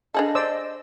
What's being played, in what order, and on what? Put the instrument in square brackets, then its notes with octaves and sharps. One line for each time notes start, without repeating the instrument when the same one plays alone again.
[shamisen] D4 G#4 A4 [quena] D#5
[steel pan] C5 D5 E6